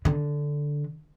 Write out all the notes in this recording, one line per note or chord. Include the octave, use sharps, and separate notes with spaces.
D3